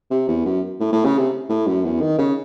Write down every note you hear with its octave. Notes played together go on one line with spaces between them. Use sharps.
C3
E2
F#2
A2
A2
C#3
C3
A2
F#2
E2
D#3
C#3